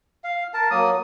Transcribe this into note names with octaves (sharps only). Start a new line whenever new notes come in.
F5
A#4 A5
F#3 A#3 D#6